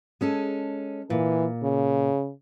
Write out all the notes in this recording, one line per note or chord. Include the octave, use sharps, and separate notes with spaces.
G#3 C#4 A4
A#2 E3
C#3